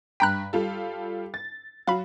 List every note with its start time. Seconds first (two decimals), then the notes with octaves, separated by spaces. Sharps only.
0.20 G2 G5 A#5 B5 F#6 B6
0.53 G3 F4 A4
1.34 A6
1.87 F#3 F#4 F5 B5